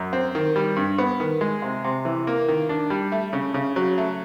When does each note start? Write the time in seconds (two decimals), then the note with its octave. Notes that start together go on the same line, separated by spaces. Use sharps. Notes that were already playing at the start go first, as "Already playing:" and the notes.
Already playing: F#2
0.13 C4
0.35 D#3
0.56 G3
0.76 G2
0.98 B3
1.20 D#3
1.41 G#3
1.62 C3
1.84 C3
2.05 E3
2.27 A#3
2.48 D#3
2.69 D4
2.90 G3
3.12 A3
3.33 C#3
3.54 C#3
3.76 F#3
3.98 A3